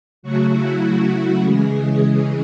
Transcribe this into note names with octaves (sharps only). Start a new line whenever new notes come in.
C#3 F#3 A3 F#4
E4
F#4
C#3 E3 G#3 G#4